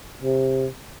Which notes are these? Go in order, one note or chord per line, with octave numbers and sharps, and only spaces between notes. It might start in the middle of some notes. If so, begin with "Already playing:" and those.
C3